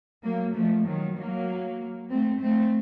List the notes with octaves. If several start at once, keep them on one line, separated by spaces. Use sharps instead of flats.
F#3 A#3
F3 A3
D#3 F#3
F#3 A#3
A3 C4
A3 C4